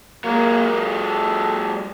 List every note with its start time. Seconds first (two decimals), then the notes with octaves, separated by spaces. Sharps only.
0.24 F#3 G#3 A#3
0.79 A4